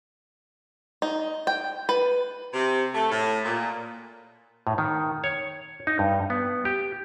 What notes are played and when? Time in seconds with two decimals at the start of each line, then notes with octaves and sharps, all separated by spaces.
1.02 D#4
1.47 G5
1.89 B4
2.54 C3
2.94 A3
3.10 A2
3.44 A#2
4.67 A2
4.78 D#3
5.24 C#5
5.87 D#4
5.99 G2
6.30 B3
6.65 G4